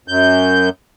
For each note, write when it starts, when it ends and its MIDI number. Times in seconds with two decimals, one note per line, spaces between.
0.08 0.69 42
0.08 0.69 91